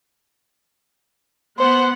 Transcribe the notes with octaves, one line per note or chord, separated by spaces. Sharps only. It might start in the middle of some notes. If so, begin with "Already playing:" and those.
B3 C5 F#5